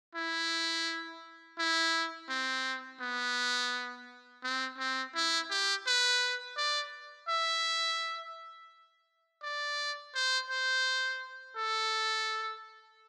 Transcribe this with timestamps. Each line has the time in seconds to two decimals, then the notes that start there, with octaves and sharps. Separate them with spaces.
0.15 E4
1.58 E4
2.29 C4
3.00 B3
4.43 C4
4.78 C4
5.15 E4
5.50 G4
5.86 B4
6.57 D5
7.29 E5
9.43 D5
10.15 C5
10.50 C5
11.56 A4